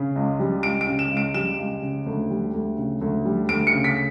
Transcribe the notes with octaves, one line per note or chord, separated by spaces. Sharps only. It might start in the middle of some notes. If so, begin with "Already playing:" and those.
Already playing: C#3
C#2
G3
C#2 D7
D7
C#3
E7
C#2
D7
G3 E7
C#2
C#3
D2
G3
D2
C#3
D2
G3
D2 D7
C#7
C#3
B6